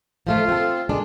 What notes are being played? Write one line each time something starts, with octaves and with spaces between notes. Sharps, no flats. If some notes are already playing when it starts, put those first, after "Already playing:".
F3 G#3 A3 F4
C4 A4
G#3 D4